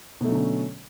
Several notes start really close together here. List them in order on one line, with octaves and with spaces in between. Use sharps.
B2 A3 F#3 D3 C#4